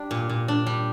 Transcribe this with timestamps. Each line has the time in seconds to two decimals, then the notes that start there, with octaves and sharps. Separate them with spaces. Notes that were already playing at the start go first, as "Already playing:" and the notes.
Already playing: G3 D4
0.11 A#2
0.29 A#2
0.48 D4
0.67 G3